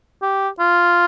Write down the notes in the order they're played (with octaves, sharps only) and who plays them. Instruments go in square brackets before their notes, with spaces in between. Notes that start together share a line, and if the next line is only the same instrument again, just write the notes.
[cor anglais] G4
F4